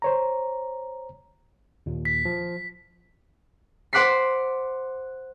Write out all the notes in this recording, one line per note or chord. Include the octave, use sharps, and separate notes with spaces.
C5 C#5 A#5
D#2 A#2
B6
F3
C5 F#5 D6 F#6 B6 C7